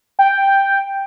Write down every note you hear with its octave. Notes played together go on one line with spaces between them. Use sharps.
G5